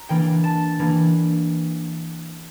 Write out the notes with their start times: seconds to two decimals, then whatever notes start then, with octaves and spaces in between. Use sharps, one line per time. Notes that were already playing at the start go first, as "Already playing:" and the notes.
Already playing: A#5
0.09 E3 A#3 D4 G5
0.44 A5
0.79 E3 A#3 D4